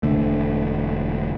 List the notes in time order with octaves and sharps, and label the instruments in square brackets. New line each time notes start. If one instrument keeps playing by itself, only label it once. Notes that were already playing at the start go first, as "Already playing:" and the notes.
[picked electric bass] E1 F2 D3 A3